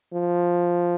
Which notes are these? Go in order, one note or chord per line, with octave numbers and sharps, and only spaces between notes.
F3